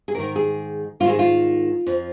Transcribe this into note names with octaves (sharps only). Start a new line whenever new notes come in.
G#4
G#2 D#3 A#4
G#4
G#2 D#3 F4 G#4
F4
F2 F3